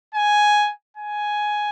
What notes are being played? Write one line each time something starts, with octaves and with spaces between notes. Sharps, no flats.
G#5
G#5